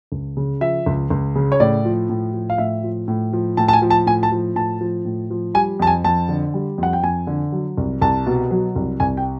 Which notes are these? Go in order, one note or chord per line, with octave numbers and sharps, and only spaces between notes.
C#2
C#3
F3 E5
C#2
C#2
C#3
C#5
A2 D5
F3
A2
F3
F5
A2 E5
F3
A2
F3
A2 A5
A5
G#5
F3
A5
A2 G#5
A5
F3
A2 A5
F3
A2
F3
G3 G#5
F2 A5
G#5
F2 A5
D3
G3
F2 F#5
G5
F2 G#5
D3
F#3
C2
C2 A5
B2
F#3
C2
C2 G#5
G5